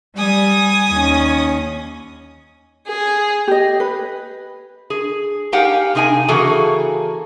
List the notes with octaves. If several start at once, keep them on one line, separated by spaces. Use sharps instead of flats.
G3 G#5 D#6
D#2 C#4
G#4
G4 D#5
B4
G#4
A#3 D#4 G4 F5 F#5 G#5
C3 D#4 G#4 G5 G#5
C#3 E3 A#3 F#4 G#4 A4